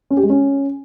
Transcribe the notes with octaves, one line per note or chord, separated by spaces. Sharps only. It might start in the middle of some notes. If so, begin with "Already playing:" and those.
C#4
G4
G#3
C#4